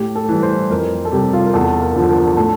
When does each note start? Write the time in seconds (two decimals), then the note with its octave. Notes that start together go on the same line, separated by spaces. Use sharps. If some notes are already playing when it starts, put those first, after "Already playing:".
Already playing: A2 G4
0.15 A4
0.29 E3 G3
0.43 C5
0.70 F2 A#4
1.05 A4
1.12 C3 G3 G4
1.33 F4
1.46 A#4
1.53 E2 A4
1.82 A#4
1.96 D3 F3
2.02 A4
2.09 A#4
2.37 A2 A4